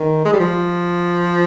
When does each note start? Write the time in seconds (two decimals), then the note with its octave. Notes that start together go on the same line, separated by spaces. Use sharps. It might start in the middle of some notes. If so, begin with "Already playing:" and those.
Already playing: D#3
0.25 G#3
0.33 G3
0.40 F3